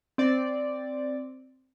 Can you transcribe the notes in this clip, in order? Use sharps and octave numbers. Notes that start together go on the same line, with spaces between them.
C4 D5